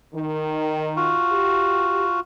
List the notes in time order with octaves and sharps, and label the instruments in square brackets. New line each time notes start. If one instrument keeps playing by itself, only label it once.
[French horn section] D#3
[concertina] F4 F#4
[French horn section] G4